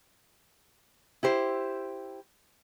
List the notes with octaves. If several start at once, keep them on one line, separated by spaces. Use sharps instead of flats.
E4 G4 C5